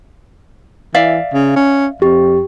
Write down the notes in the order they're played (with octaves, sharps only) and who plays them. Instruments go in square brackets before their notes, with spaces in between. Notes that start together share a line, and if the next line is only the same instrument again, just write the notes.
[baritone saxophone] E3 [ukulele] D5 E5 F5
[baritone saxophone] C#3
C#4
[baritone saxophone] F2 [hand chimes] G4